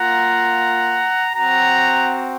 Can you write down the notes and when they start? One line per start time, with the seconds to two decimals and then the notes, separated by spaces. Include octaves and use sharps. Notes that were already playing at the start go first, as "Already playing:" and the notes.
Already playing: A#3 F4 F#5 A#5
1.35 C4 F#4 F#5 A#5